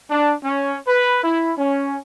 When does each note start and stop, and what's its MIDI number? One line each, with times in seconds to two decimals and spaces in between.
0.10 0.34 62
0.44 0.77 61
0.88 1.21 71
1.24 1.53 64
1.58 1.98 61